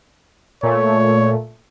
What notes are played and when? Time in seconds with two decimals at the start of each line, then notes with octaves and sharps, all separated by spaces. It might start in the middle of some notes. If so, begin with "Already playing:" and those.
0.63 A#2 A3 C#5